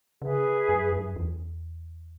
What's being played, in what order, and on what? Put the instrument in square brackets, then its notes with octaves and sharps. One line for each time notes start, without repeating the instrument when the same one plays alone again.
[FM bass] C#3 [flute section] G#4 B4 E5
[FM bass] F#2
F#2
E2